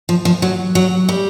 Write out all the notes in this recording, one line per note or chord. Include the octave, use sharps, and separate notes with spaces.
F3
F3
F#3
F#3
G3